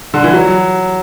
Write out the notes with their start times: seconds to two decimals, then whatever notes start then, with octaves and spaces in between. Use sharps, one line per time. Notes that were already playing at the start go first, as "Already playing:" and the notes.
0.14 D3
0.24 E3
0.33 F#3